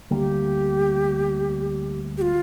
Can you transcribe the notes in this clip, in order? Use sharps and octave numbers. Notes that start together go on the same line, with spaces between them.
D2 D3 G3 A#3 G4
G4
F4